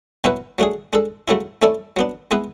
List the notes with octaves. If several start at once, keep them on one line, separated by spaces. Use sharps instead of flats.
B2 F#3 C#4 E4 B4
F#3 A3 D4 G#4
G#3 D4 A4
C#3 F#3 A3 C#4 E4
A3 C#4 E4 A4 D5
F#3 B3 D4
G#3 B3 E4 B4